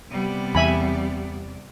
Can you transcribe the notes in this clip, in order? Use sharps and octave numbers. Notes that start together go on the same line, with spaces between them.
C3 G3 B3 D5
E2 E5 G#5 B5